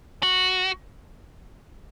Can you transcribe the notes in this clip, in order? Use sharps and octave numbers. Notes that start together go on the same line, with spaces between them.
F#4